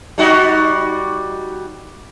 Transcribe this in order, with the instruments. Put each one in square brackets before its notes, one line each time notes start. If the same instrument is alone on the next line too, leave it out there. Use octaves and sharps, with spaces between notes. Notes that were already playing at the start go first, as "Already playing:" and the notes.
[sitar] G3 D#4 F#4